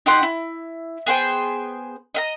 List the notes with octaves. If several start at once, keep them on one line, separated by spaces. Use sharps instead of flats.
D#4 G4 F#5 C6
E4
B3 G#4 C5 G5
D#5 E5 A#5